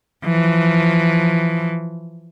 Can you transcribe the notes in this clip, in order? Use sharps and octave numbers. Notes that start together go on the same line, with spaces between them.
E3 F3